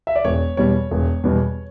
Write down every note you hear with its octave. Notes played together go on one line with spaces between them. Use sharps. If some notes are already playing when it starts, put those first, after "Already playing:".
E5
D5
E1 C#5
E2 B2 G3 C#5
E1
E2 B2 G3